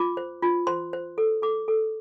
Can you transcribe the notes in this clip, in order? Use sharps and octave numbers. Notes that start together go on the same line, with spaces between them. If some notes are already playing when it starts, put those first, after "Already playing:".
Already playing: F4 D6
C5
F4
C5 C6
C5
A4
A4 D6
A4